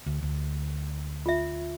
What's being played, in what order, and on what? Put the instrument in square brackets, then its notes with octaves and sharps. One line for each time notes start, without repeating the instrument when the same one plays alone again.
[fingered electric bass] D2
D2
[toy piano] F4 E5